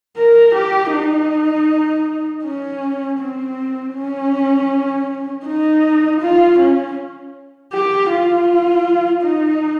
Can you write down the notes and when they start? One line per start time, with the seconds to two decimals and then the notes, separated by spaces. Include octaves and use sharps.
0.17 A#4
0.55 G4
0.93 D#4
2.44 C#4
3.18 C4
3.95 C#4
5.46 D#4
6.21 F4
6.59 C#4
7.72 G4
8.10 F4
9.23 D#4